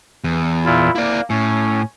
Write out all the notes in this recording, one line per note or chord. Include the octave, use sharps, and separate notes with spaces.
E2
A#2 E4 F4
A#3 E4 D5
A2 C#4